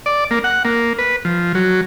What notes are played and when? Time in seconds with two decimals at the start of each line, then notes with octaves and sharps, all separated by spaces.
0.06 D5
0.31 A#3
0.44 F#5
0.65 A#3
0.99 B4
1.25 F3
1.55 F#3